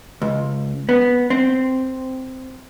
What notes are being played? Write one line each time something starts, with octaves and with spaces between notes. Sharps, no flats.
C#2
B3
C4